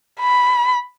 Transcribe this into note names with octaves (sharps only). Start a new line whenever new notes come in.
B5